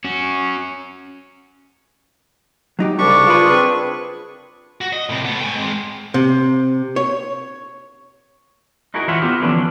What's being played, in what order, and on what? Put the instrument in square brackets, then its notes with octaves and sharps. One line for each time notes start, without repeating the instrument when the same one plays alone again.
[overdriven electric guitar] C#4 F#4
[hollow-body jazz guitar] F#3 D#4 G4
[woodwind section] C2 C#3 D6 [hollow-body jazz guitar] G3 [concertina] D4 C#6
[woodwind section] F4 G#4 [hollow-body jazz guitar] A#4 B4
[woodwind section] C4 G#4 [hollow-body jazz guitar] B4
[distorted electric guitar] F#4
D#5
A2 C3
A3 B3
G5 G#5
G#3 C4
[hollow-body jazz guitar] C3
C#5
[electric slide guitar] D#4 E4 F#4 G#4 A#4
E3 E4 F4 C#5 E5 F#5
B3 E4 F4 G4
D3 E3 F3 B3 C#4 D4